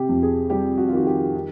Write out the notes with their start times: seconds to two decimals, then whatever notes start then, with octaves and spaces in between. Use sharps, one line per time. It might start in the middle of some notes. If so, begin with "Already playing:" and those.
Already playing: C3 G4
0.09 F2
0.23 G#4
0.50 G3 G4
0.78 F#4
0.88 F4
0.92 D#3 F#4
1.07 G4
1.34 D#3